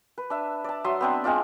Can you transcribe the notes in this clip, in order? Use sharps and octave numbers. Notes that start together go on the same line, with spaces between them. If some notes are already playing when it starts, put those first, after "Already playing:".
B4
D4 E5
D5 A5
F#3 E5 C6 D#6
B3 C4 D4
G#3 C4 F4 D5